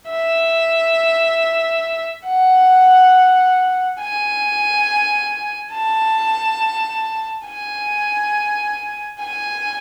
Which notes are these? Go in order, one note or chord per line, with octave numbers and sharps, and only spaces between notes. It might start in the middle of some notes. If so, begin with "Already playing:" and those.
E5
F#5
G#5
A5
G#5
G#5